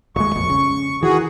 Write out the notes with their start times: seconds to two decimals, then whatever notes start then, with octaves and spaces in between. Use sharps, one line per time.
0.16 D#1 G#3 C#6
0.35 A#1 F2
0.50 C#3
1.03 D#3 E3 F#4 G#4